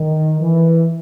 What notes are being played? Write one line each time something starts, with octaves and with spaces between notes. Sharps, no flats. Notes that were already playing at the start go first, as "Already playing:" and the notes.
Already playing: D#3
E3